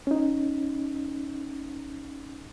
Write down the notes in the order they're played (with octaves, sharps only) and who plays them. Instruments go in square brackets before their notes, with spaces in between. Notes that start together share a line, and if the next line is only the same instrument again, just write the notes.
[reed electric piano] C#4 D#4